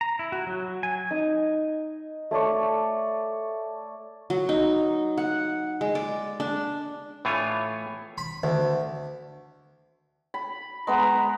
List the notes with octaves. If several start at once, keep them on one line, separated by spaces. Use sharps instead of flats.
A#5
E4
F#4
F#3
G#5
D#4
A3 C#5 D5 C#6
F#3
D#4
F#5
G#3
D5
D4
A2 E3 A3 F4 C#5 G#5
B5
D2
B5
G#3 B3 B4 A#5